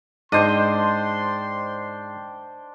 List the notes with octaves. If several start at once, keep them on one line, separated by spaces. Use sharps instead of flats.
G#2 D4 C5 D#5 G5 C6